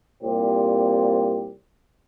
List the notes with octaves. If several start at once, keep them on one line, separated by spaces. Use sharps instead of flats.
C2 A#2 C4 G4